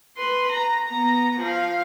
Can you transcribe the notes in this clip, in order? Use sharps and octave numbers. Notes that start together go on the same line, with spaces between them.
B4 C6
A#5
B3 A#5
F3 F5